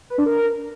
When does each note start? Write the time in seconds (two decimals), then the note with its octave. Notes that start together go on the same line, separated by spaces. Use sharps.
0.10 B4
0.18 D4
0.26 A#4